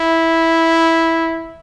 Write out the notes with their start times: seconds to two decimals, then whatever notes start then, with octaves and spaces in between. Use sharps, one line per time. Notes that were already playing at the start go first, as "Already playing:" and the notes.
Already playing: E4